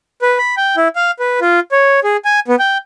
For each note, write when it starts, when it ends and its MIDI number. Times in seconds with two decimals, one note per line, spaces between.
0.22 0.38 71
0.38 0.55 83
0.57 0.76 79
0.77 0.88 64
0.96 1.11 77
1.19 1.40 71
1.41 1.60 65
1.72 2.00 73
2.04 2.17 68
2.25 2.40 80
2.48 2.56 59
2.59 2.78 79